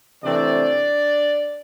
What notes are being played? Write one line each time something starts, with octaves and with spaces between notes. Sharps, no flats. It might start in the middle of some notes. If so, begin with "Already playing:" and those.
C3 E3 A3 C4 D4 D5